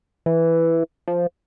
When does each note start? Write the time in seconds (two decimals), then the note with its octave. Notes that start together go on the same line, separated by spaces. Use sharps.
0.26 E3
1.08 F3